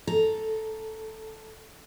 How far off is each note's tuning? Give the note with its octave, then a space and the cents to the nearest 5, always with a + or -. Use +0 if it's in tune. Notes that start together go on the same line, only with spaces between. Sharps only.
A4 -5 A#5 +0